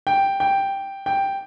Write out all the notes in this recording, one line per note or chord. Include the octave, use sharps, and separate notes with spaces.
G5
G5
G5